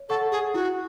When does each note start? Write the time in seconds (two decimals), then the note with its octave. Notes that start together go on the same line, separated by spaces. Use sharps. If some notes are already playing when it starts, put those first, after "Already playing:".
Already playing: C#5
0.09 A4 F#5 C#6
0.31 G#4
0.54 E4 F#4